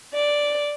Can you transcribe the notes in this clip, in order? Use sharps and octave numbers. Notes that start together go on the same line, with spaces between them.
D5